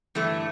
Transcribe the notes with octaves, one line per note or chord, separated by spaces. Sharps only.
G2 E3 A3